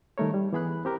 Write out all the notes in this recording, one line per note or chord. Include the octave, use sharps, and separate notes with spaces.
D#3 G3 A3 A#4 C#5
G3
E3 B3 G#4 B5 F#6
C4 G4 A#4